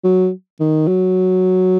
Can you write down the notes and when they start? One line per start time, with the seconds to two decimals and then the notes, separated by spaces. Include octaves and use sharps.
0.04 F#3
0.60 D#3
0.87 F#3